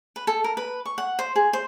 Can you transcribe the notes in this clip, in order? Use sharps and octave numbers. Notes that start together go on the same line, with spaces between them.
B4
A4
A#4
B4
C#6
F#5
C5
G#4
C5